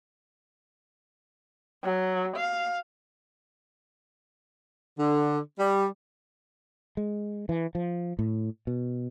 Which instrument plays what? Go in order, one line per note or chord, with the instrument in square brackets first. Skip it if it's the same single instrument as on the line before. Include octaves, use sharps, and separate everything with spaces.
[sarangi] F#3
F5
[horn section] D3
G3
[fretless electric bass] G#3
E3
F3
A2
B2